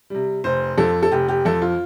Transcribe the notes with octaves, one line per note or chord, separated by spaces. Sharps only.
C3 G3
F1 C5
F2 F3 A4
A4
F1 G4
G4
F2 F3 A4
F4